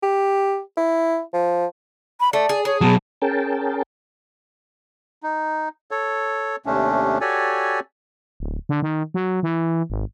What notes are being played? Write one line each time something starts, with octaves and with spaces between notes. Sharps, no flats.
G4
E4
F3
B5
A3 D5
G#4
G#4 C#5
B2 F#3 A5
C#4 G#4 A#4 G5 A5
D#4
A4 C#5
D#2 C3 A3 C#4 D4
F#4 G4 A4 C#5 D5 G#5
D1
D3
D#3
F#3
E3
G#1